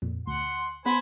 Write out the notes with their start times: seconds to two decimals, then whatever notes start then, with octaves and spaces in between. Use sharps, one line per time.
0.02 F2 A#2
0.27 D2 F#5 C6
0.86 B3 G#4 B4 C5 G#5 B5